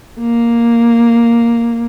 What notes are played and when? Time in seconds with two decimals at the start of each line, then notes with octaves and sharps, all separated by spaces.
0.19 A#3